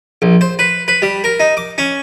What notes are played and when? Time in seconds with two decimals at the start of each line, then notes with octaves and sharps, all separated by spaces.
0.22 A#1
0.41 C5
0.59 B4
0.88 B4
1.02 G3
1.24 A#4
1.40 D#4
1.57 D6
1.78 C#4